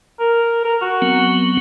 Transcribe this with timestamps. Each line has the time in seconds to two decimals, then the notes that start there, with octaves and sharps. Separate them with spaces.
0.20 A#4
0.65 A#4
0.82 F#4
1.02 F#3 B3 C4